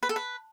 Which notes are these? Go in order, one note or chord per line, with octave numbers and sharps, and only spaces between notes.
B4
A4
B4